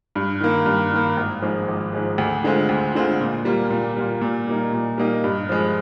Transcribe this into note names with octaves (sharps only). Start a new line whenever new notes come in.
G2
D#3 A#3
G2
D#3 A#3
G#1
G#2 F3 G#3
G#1
G#2 F3 G#3
D2
D3 G#3 C4 F4
D2
D3 G#3 C4 F4
A#2
G3 A#3 F4
A#2
G3 A#3 F4
A#2
G3 A#3 D#4
A#2
G3 A#3 D#4
G2
F3 G#3